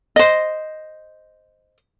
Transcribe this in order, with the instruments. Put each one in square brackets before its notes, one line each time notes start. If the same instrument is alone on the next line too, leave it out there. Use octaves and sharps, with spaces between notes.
[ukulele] C5 D#5